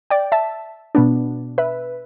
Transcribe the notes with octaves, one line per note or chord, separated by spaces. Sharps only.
D5 G5
E5 A5
B2 B3 D4
B4 E5